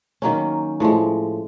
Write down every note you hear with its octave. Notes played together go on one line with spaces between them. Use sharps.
D#3 F#3 A#3 C#4
A2 F3 G#3